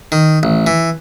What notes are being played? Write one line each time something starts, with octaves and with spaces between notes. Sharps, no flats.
D#3
A1
E3